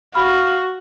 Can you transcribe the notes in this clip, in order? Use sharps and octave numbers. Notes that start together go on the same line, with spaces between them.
F#4 F5 B5